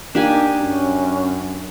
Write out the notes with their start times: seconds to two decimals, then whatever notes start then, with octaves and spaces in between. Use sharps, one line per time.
0.15 A#3 D4 D#4 G4 G#5
0.60 F#2 C#4